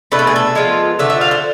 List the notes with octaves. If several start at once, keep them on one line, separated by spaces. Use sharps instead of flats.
B2 A3 D4 B4
A4
G#4
A4
F3 G#3 B3 F4
D3 F3 A3 D4 E5
E5
F5
C5